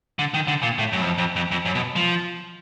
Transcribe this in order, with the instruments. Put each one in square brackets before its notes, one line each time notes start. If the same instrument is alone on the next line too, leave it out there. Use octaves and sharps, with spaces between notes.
[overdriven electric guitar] D3
D#3
D3
A#2
A2
F#2
F2
F2
F2
F2
F#2
B2
F3